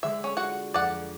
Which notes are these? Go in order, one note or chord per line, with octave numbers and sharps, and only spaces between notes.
D3 G#3 D4 E5
C#4
F4 F#4 F#5
F2 D5 F#5